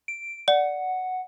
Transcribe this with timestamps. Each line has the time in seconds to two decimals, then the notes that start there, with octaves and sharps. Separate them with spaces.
0.08 D7
0.48 D5 F#5